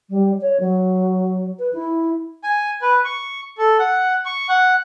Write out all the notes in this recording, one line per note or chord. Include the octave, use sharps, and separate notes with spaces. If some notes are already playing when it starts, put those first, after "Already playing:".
G3
C#5
F#3
B4
E4
G#5
B4
C#6
A4
F#5
C#6
F#5